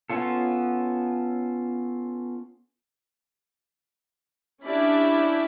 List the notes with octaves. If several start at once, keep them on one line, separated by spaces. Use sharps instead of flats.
B3 C#4 F4 A4
C#4 D4 E4 G4 D5 B5